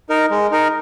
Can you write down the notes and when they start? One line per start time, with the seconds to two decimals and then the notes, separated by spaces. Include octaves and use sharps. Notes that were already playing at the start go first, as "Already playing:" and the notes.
0.09 D#4 A#4
0.30 G#3
0.51 D#4 A#4